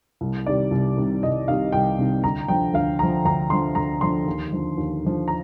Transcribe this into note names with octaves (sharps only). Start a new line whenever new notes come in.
C2
C3 D#3 G3 D5
C2
C3 D#3 G3
C2 D#5
C3 D#3 G3 F5
C2 G5
C3 D#3 G3
D2 A#5
D3 F3 G5
D2 F5
D3 F3 A#5
D2 A#5
D3 F3 C6
D2 A#5
D3 F3 C6
D#2
D3 F3
D#2
D3 F3
A#5